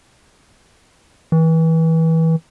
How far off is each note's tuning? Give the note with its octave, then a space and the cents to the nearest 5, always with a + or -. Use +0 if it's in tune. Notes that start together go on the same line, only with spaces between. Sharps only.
E3 -25